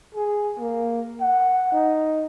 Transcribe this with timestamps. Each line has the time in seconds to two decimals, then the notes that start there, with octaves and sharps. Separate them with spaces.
0.15 G#4
0.59 A#3
1.21 F#5
1.72 D#4